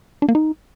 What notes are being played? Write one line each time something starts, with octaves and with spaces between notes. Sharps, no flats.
D4
A#3
D#4